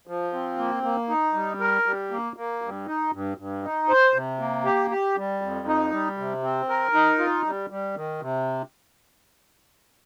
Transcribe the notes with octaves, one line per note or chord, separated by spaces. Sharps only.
F3
C4
A#3
A#3
D#4
G3
A#4
G3
A#3
A#3
G2
D#4
G2
G2
D#4
C5
C3
A#3
G4
G4
G3
F2
D#4
G3
C3
C4
A#4
D#4
F4
G3
G3
D#3
C3